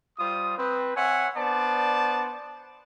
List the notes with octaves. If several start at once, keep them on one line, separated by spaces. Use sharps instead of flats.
G3 F4 C5 D#6
C4 B4
C4 C#5 E5 F#5 G#5
B3 D4 C5 D5 A5